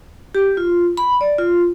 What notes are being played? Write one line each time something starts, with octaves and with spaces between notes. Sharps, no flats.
G4
F4
B5
D5
F4